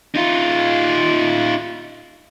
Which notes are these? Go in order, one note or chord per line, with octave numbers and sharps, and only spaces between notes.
D#4 F4